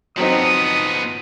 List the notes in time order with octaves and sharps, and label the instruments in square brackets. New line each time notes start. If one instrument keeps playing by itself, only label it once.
[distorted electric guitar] F3 B3 [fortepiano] F#3 C4 D#4 [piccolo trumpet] D#6